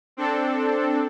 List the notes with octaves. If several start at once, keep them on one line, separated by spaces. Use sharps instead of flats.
C4 D4 A4